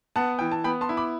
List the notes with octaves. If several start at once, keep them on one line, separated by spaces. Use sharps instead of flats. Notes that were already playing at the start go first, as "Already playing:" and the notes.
B3 F#5 A5
E3 G5
A5
B3 G5 B5
A5 C6
E4
B5 D6